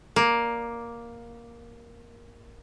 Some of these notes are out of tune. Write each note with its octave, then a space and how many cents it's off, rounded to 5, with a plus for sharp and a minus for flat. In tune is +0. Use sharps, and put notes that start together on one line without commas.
A#3 +10 D5 +0